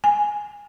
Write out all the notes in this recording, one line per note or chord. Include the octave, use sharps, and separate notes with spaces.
G#5